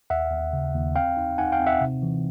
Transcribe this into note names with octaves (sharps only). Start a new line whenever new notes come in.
D#2 E5 F#5
D#2
C#3
D#2
C4 F5 G5
D#4
D#4 F#5 G#5
F5 G5
C4
E5 F#5
C3
E3